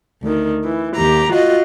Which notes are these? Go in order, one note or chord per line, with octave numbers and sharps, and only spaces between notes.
D2 D#3
E3
D#2 G4 A#5
F4 F#4 D#5